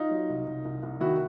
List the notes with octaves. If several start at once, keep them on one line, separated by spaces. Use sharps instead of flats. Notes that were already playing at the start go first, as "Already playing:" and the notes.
Already playing: D#4 F4
F#3
C2
C2
C2
C2
D#3 E4 F#4